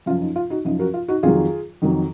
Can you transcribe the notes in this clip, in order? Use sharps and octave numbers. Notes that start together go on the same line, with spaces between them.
F#2 F3 F4
D#4
F4
D#4 F#4
F#2 F3 D#4
F#4 A#4
F4
D#4 F#4
F2 D#3 F#3 F4 G#4
F2 D#3 F#3